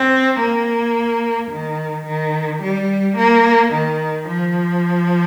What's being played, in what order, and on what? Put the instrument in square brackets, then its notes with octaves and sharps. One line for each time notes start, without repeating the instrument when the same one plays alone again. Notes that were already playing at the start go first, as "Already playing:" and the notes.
Already playing: [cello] C4
A#3
D#3
D#3
G3
A#3
D#3
F3